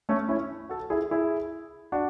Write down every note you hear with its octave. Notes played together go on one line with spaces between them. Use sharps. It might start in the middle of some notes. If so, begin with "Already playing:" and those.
A3 C#4
C#4 E4
F#4 A4
E4 G#4
E4 G#4
D4 F#4